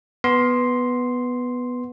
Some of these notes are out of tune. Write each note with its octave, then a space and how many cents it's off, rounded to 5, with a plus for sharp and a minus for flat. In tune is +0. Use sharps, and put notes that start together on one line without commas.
B3 +0 C6 +0